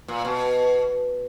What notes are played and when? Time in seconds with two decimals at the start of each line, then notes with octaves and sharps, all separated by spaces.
0.08 A#2
0.25 B2